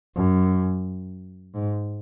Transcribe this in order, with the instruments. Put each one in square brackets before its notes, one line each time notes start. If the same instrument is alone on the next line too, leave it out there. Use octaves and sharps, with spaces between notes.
[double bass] F#2
G#2